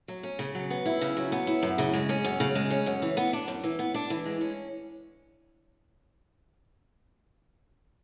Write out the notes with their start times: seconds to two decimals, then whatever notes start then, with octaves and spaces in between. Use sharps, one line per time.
0.08 F#3
0.23 C#4
0.39 C#3
0.55 F#3
0.70 B3
0.86 E4
1.01 C#3
1.17 F#3
1.32 B3
1.47 E4
1.63 F#2
1.78 C#3
1.94 G#3
2.09 C#4
2.24 F#2
2.40 C#3
2.55 G#3
2.70 C#4
2.86 F#2
3.02 E3
3.17 B3
3.33 D4
3.48 F#2
3.64 E3
3.79 B3
3.94 D4
4.10 E3
4.25 G#3
4.41 C#4